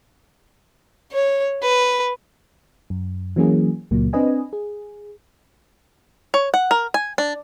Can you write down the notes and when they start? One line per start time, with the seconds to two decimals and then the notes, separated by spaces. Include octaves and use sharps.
1.12 C#5
1.62 B4
2.90 F#2
3.36 E3 F#3 A#3 C#4 G#4
3.91 C#2 A#2 F#3 A#3
4.13 C4 D4 B4 D#5 G#5
4.53 G#4
6.34 C#5
6.54 F#5
6.71 A#4
6.94 G#5
7.18 D4